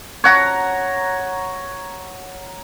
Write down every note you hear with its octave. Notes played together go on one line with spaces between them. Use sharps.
C#5 F#5 A#5